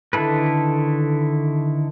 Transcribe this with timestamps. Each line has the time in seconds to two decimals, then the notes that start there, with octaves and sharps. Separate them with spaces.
0.13 D3 D#3 E4 A4 B4